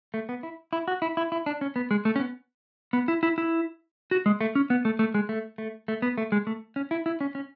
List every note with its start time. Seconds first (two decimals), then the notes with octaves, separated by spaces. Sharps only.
0.14 A3
0.29 B3
0.43 E4
0.73 E4
0.88 F#4
1.02 E4
1.17 E4
1.32 E4
1.46 D4
1.61 C#4
1.76 B3
1.91 G#3
2.05 A3
2.16 C#4
2.20 B3
2.93 B3
3.08 E4
3.23 E4
3.38 E4
4.11 F#4
4.26 G#3
4.41 A3
4.55 C#4
4.70 B3
4.85 A3
4.99 A3
5.14 G#3
5.29 A3
5.58 A3
5.88 A3
6.02 B3
6.18 A3
6.32 G#3
6.47 A3
6.76 C#4
6.91 E4
7.06 E4
7.21 C#4
7.35 C#4